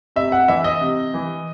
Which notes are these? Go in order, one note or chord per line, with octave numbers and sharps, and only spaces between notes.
C3 E5
F#5
E3 E5
D#5
C3
E3